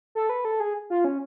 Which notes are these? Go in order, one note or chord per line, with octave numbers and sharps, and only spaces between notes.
A4
B4
A4
G#4
F4
C#4